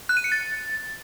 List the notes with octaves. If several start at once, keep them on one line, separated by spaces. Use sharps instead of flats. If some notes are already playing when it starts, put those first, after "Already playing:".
F#6
D#7
C#7
A6